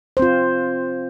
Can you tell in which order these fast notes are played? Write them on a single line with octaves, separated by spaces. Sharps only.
C5 C4 F4